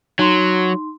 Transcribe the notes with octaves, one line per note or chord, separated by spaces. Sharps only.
F#3 D#4 C6